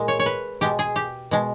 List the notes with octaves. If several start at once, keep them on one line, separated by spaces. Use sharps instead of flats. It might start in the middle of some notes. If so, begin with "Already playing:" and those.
Already playing: A#2 G#3
C#5
C#5
B4
B2 G#3 G4
G#4
G4
B2 G#3